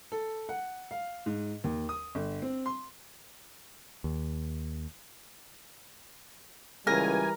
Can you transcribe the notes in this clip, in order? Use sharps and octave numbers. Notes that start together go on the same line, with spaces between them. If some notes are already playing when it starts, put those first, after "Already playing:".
A4
F#5
F5
G#2
D#2
D#6
G1
C4
C6
D#2
C#2 E3 G3 A#4 G#5